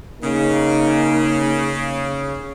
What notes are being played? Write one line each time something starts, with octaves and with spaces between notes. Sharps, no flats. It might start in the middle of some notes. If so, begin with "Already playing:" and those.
C#3 A#3 D#4